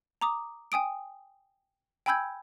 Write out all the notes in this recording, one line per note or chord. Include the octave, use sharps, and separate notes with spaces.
A#5 D6 D#6
G5 G#5 D#6 D7
G5 G#5 B5 E6 G6 G#6